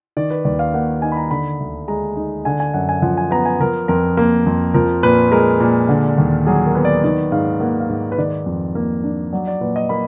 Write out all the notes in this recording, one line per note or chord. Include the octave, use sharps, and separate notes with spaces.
D#3 D5
B4
D#2 D5
F5
A#3 F#5
D#4 G#5
B5
A#5
D3 B5
D2
G#3 A#5
D#4
D3 G#5
G#5
F#2 F#5
G#5
F3 F#5
G#5
B3 A#5
G#5
F3 A#4
F2 A#4
A#3
F2
F3 A#4
A#2 B4
G#3 A#4
A#2
D3
D#2
F#3 G#4
A#4
B3
D5
D#3 D5
G#2 F5
A#3 F#5
F5
G#2
B4
D#3 D5
F2
A#3
D4
F#3 D5
D5
A#2 B4
D#5
A#3 B5